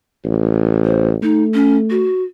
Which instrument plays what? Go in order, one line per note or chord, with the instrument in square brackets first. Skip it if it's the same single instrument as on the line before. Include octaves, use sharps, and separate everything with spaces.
[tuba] A1
[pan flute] C5
[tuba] A3 [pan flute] D#4
[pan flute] C#4
F#4